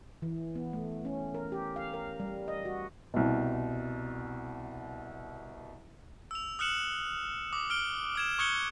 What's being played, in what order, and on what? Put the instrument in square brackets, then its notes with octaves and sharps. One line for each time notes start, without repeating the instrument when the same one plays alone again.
[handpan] E3
B3
A3
C#4
A#4
G4
F5
A#4
G3
D#5
F#4
[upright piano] C2 B2
[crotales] E6 F7
D#6 F6 F#6 C#7 E7 F#7
D6 D#6
F6 D7 G7
D#6 G#6 E7
C#6 D#6 F#6 G#6 C#7 G7